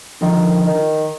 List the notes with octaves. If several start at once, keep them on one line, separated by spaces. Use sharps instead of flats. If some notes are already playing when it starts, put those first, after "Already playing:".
D3 D#3 F3
D#3